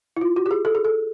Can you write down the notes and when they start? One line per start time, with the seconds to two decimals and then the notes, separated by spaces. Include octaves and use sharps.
0.17 E4
0.21 F4
0.36 F#4
0.46 G4
0.51 G#4
0.65 A4
0.75 G#4
0.85 A4